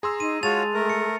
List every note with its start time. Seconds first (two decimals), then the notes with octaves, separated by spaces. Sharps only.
0.03 G#4 A#5 C6 E6
0.20 D#4 D#7
0.43 G#3 F4 F#4 C#5 A5 A6 F7
0.74 A3 A#4
0.90 C#7